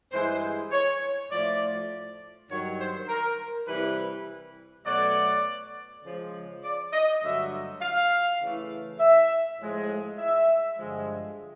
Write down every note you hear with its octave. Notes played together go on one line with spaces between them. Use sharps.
G2 E3 G#3 C5
C#5
A2 F3 A3 D5
G2 D#3 F#3 C#5
C5
A#4
C3 E3 G3 B4
B2 F#3 A3 D5
C#3 F3 G#3
D5
D#5
G2 D3 F#3 A3 E5
F5
C#3 E3 A3
E5
A2 F3 G#3
E5
G2 D3 F3 G#3